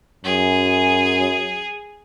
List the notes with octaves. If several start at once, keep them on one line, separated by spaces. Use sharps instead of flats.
F#2 G#4